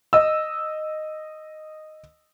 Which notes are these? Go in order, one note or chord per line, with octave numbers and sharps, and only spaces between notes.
D#5 E6